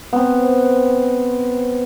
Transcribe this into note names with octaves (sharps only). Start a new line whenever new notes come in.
B3 C4